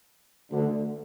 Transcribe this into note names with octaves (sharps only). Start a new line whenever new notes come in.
D2 D3